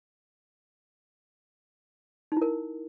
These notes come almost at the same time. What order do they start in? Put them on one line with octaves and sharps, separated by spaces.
D#4 E4 A#4